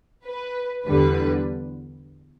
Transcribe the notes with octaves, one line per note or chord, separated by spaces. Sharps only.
B4
E2 D3 G3 B4